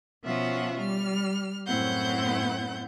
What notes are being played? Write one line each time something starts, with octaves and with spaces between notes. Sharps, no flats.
B2 F3 C#4 F4 E5 F#5
G3 F6
F#2 A2 C4 E4 F#5 G6